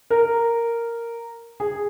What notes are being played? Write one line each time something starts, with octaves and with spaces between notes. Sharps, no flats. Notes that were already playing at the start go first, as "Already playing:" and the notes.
A#4
G#4